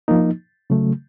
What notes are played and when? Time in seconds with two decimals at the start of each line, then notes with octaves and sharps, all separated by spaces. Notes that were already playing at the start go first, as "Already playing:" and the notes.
0.08 F3 A#3 D#4
0.70 C#3 F#3 A3